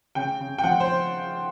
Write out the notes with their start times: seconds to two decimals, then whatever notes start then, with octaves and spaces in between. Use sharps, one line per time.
0.15 C#3 G5
0.40 C#3
0.58 G5
0.64 F3 F#5
0.80 C5